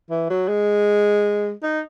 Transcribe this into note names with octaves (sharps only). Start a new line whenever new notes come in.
E3
F#3
G#3
D#4